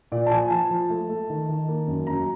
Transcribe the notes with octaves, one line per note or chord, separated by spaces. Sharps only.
A#2 D5
A5
F3 G#5
F3 A5
F3
A3
A3
D#3
D#3
A#3
F#2
F#2 A#5